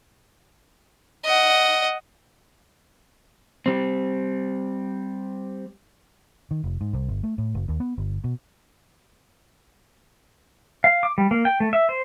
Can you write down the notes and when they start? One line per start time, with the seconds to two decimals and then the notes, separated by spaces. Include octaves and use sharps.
1.24 D#5 F#5
3.66 G3 C4
6.51 D#3
6.64 F1
6.81 G#2
6.93 C2
7.09 G1
7.23 A3
7.38 A2
7.55 F#1
7.68 D#2
7.80 B3
7.98 G1
8.24 B2
10.84 F5
11.03 D6
11.18 G3
11.31 A#3
11.45 G5
11.60 A3
11.73 E5
11.89 C5